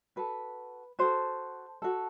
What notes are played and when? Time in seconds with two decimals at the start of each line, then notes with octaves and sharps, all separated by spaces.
0.16 F#4 A4 B4
0.99 F#4 A4 C5
1.82 F#4 A4